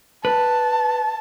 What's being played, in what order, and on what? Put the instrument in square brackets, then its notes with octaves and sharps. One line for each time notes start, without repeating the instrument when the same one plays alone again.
[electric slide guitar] B4 [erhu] A5